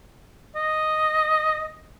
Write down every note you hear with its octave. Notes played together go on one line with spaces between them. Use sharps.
D#5